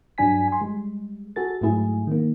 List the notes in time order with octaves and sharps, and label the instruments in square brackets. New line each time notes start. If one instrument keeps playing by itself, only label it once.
[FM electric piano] G2 F#3 D4 G#5 B6
G#5 C6
G3 G#3
F#4 G#4 A4 A6
G#2 F#3 A3 E4 G#4
D#3 A#3